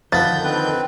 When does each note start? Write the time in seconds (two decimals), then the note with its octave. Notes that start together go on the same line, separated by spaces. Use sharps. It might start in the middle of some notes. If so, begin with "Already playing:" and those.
0.12 D3 D#3 F3 B3 G6 A6
0.44 C4 B4